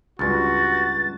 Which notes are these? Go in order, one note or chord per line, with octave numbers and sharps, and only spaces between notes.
C#2 G2 F#4 A6